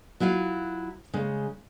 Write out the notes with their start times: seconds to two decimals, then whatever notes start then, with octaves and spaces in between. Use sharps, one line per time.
0.20 F#3 E4 F4 F5
1.14 C#3 G#3